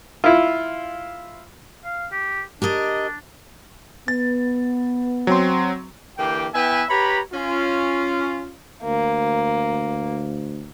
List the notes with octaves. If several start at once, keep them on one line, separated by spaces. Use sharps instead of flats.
E4 F4
F5
G4
D4 G4 A#4 D#5
B3 A6
F#3 C4 C6
D3 E3 A#3 G4 G5
B3 E4 B4 E5 G5 G#5
G4 B4 C#5 A#5 B5
C#4 F4
D2 A#3